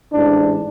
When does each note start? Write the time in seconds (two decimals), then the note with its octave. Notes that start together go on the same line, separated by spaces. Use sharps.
0.13 A1 G#2 E3 D4